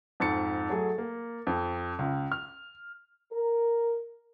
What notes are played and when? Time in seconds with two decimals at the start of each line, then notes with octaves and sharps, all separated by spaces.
0.20 F2 G#2 A6 C#7
0.69 F#3 A3 G#4
0.98 A#3
1.47 F2
1.99 C#2
2.32 F6
3.32 A#4